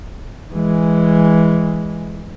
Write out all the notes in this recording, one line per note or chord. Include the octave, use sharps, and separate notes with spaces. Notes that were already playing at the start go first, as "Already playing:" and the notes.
E3 G#3